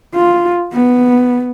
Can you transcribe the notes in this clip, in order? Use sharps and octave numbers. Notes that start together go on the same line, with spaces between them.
F4
B3